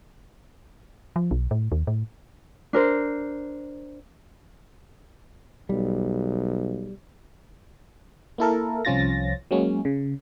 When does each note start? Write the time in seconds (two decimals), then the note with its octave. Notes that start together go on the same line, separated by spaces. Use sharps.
1.16 F3
1.31 B1
1.51 A2
1.72 D#2
1.87 A2
2.73 D4 A#4 C5
5.69 B1 G3
8.38 A#3 E4 A4 A#4
8.85 C2 F3 C#4 F4 A6 A#6
9.51 F#3 G#3 A#3 C#4
9.85 C#3